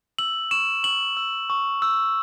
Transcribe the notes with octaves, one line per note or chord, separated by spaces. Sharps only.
E6 F#7
C#6 E7
C#6 F#7
E6
C#6
E6